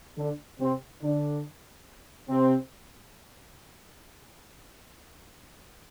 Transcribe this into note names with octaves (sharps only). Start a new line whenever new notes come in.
D3 D4
C3 C4
D3 D4
C3 C4